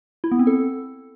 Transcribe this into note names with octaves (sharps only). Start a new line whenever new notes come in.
E4
B3
C4
A4